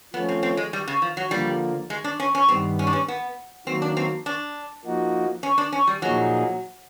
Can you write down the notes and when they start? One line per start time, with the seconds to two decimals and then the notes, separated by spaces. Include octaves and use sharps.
0.14 F3 A3 B3 C#4
0.29 C4
0.43 C4
0.57 G#3
0.73 G3
0.87 C#3
1.02 F3
1.17 F#3
1.31 D3 F3 G3 A#3
1.90 G#3
2.04 D4
2.20 C#4
2.35 C#4
2.49 G2 D#3 G3 B3 C4
2.79 C#4
2.87 D4
2.93 C#4
3.08 B3
3.67 D#3 F#3 A#3 C4
3.82 D4
3.97 C4
4.26 D4
4.85 F3 A#3 D#4 F#4
5.43 C#4
5.58 D4
5.72 C#4
5.87 G3
6.02 A#2 F3 F#3 A#3 D#4 G#4